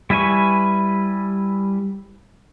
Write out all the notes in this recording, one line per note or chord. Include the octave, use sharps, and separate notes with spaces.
G3 E4 B4 G#5 C#6